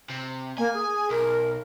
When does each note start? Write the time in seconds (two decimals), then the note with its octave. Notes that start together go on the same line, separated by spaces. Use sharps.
0.10 C3
0.58 A#3 G#5
0.74 G#4
1.10 B1 A#4